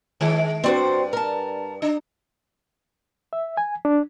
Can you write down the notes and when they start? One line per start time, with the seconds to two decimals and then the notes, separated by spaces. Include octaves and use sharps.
0.21 D#3 G#3
0.64 G2 C4 F#4 C5 D5
1.13 A#4 A5
1.82 D4
3.33 E5
3.57 G#5
3.85 D4